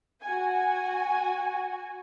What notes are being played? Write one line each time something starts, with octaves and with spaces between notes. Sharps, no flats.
F#4 G#5